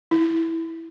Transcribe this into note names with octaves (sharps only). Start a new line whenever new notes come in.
E4